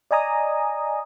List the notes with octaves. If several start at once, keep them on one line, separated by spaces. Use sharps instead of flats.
D5 D#5 G#5 A#5 D#6